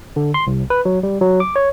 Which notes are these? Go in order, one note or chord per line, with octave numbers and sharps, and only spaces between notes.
D3
C6
C2
B4
F#3
G3
F#3
D6
C#5